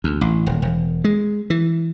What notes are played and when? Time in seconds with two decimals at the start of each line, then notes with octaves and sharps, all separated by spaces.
0.04 D2
0.21 A1
0.46 D#1
0.62 E1
1.04 G#3
1.50 E3